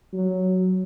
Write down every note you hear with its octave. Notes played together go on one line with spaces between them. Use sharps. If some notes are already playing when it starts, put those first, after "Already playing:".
F#3